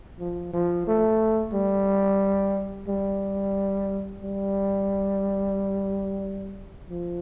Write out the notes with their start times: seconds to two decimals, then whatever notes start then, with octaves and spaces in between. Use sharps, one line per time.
0.20 F3
0.53 F3
0.87 A3
1.54 G3
2.88 G3
4.22 G3
6.89 F3